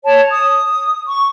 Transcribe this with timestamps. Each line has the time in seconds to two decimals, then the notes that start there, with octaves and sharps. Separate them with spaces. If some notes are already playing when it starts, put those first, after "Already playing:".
0.04 C#5 A5
0.30 D#6
1.08 C#6